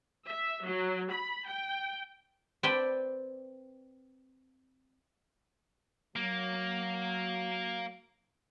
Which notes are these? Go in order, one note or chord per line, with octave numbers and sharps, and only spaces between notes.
E5
F#3
B5
G5
C4 B4 D5 G5 A5 B5
F#3 A#3